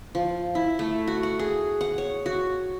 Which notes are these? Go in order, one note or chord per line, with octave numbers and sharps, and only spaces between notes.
F3
E4
A3
F#4
F#5
G#4
F#5
C#5
F#4